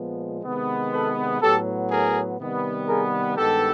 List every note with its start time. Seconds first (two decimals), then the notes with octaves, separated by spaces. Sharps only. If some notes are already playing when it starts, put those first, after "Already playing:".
Already playing: A#2 F3 G#3 B3
0.44 C3 D#3 G#3 B3
0.93 A4 B4
1.41 A2 F#3 B3 G4 A4
1.91 G#4 A#4
2.40 C3 D#3 G3 B3
2.88 G#4 A#4
3.36 G2 D#3 G#3 B3 G4 A4